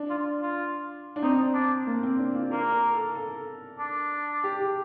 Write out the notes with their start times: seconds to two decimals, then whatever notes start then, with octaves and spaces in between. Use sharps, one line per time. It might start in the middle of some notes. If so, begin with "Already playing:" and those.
Already playing: D4
0.10 F4
0.42 F4
1.16 D4
1.22 C4 D#4
1.54 D4
1.87 A#3
2.03 C4
2.19 D4
2.35 F4
2.51 A#3 A#4
2.72 A#4
2.94 A4
3.15 A4
3.79 D4
4.44 G4
4.60 G4